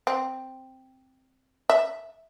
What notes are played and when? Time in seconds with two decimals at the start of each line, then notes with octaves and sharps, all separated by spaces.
0.07 C4
1.70 E5